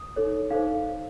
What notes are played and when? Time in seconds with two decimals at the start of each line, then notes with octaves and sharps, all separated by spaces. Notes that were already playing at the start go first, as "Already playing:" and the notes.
Already playing: D#6
0.16 D#4 A4 C#5
0.50 D#4 A4 C5 F5